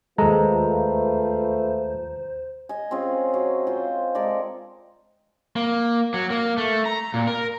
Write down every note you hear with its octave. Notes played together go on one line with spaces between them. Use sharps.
D#2 G#3 A3 F4 A4 B4 C5 A#5
D#5 G#5
C4 C#4 F4 G#4
F#3
F4 C5 D#5
G#3 A4 A#4 D5
A#3
F#3
A#3
A3
A#5
A#2
A#4